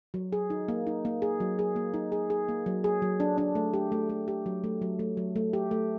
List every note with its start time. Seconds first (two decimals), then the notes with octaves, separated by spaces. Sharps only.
0.14 F#3
0.32 G#4
0.50 D#4
0.68 A#3
0.87 D#4
1.05 A#3
1.22 G#4
1.40 F#3
1.59 G#4
1.76 A#3
1.94 D#4
2.12 G#4
2.30 G#4
2.49 A#3
2.66 F#3
2.84 G#4
3.02 F#3
3.20 D4
3.38 D4
3.55 A3
3.73 G4
3.92 A3
4.09 A3
4.28 G4
4.46 F#3
4.64 A3
4.82 F#3
4.99 A3
5.17 F#3
5.36 A3
5.53 G4
5.71 A3